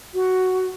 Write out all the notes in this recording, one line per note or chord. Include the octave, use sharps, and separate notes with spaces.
F#4